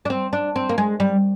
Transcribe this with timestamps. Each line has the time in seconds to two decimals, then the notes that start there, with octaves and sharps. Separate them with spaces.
0.05 D4
0.10 C4
0.33 D4
0.56 C4
0.69 A#3
0.78 G#3
1.00 G3